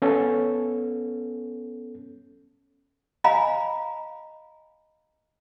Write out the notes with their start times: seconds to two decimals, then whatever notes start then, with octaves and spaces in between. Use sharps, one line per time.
0.02 B3 C#4 A4
3.24 D#5 F5 G#5 A#5 B5